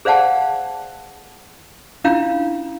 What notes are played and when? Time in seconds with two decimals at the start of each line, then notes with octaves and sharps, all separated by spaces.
0.05 G#4 C5 D5 F5 F#5 A5
2.04 C#4 D4 E4 F4 F5 G5